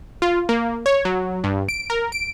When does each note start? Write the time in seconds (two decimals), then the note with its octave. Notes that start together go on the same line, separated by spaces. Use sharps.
0.22 F4
0.49 A#3
0.86 C#5
1.05 F#3
1.44 G2
1.69 D7
1.90 A#4
2.12 D7